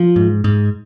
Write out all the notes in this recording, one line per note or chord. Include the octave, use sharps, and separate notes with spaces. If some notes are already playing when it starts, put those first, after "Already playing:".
Already playing: F3
G#2
G#2